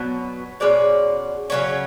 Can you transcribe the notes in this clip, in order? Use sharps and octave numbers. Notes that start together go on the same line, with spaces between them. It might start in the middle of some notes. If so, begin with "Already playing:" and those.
Already playing: B2 F#3 B3
B2 G#3 C#4 D5
C#3 F#3 C#4